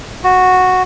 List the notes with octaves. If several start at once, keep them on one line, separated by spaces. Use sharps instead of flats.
F#4